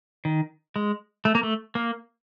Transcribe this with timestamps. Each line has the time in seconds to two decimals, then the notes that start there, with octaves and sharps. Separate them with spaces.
0.25 D#3
0.76 G#3
1.25 A3
1.35 A#3
1.43 A3
1.75 A#3